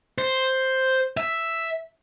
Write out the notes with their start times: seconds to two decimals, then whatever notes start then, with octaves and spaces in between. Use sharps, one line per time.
0.18 C5
1.17 E5